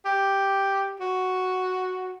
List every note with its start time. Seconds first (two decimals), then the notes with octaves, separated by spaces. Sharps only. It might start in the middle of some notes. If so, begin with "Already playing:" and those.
0.05 G4
1.00 F#4